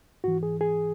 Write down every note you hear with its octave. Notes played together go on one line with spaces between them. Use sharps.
G#2 E3 F#4
G#4
G#4